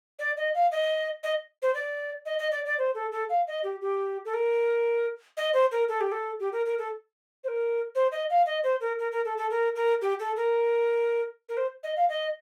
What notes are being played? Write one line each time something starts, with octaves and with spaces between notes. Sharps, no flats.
D5
D#5
F5
D#5
D#5
C5
D5
D#5
D#5
D5
D5
C5
A4
A4
F5
D#5
G4
G4
A4
A#4
D#5
C5
A#4
A4
G4
A4
G4
A#4
A#4
A4
C5
A#4
C5
D#5
F5
D#5
C5
A#4
A#4
A#4
A4
A4
A#4
A#4
G4
A4
A#4
A#4
C5
D#5
F5
D#5